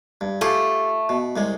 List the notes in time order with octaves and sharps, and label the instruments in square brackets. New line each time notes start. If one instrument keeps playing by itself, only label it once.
[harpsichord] G2
[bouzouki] A3 [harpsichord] F4 G4 G#4
[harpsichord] B2
C2 C3 G#3